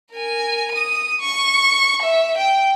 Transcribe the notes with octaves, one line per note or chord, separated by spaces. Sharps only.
A#4 G#5
D#6 D#7
C#6
E5
G5